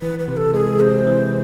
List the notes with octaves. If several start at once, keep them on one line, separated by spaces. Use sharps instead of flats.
E3 B4
B4
C3
A4
G#3 G#4
C3 C5
E3